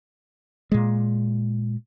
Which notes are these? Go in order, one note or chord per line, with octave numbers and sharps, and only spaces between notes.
A#2 G#3